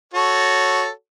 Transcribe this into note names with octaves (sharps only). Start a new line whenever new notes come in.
F#4 A4 C#5